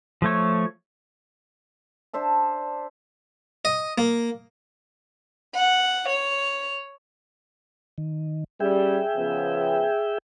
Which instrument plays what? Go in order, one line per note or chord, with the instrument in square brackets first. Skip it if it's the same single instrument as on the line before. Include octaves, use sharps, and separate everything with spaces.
[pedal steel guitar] F3 A3 C#5
[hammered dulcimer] D4 C5 E5 A5
[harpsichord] D#5
A#3
[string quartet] F#5
C#5
[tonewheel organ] D#3
[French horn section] G3 C#4 [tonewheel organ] G#4 E5 G5
[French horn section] C#3 F3 B3